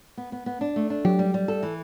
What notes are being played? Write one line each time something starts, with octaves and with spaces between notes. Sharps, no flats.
B3
B3
B3
D4
A3
D4
F#3 G4
G3
G3
A4
E3